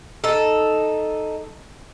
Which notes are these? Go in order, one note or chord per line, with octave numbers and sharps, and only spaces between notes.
D#4 A4